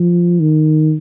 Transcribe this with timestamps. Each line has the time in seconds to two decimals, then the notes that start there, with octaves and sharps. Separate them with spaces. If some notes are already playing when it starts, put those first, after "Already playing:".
Already playing: F3
0.40 D#3